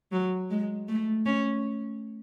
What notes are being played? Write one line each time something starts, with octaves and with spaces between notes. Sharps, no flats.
F#3
G#3
A3
C#4